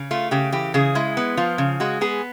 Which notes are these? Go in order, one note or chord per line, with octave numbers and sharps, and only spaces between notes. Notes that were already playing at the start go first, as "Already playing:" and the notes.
Already playing: C#3
A3 F4
C#3 G4
E3 G4
C#3 G#4
G#3 E4
B3
F3 F4
C#3
G#3 F#4
B3 G#4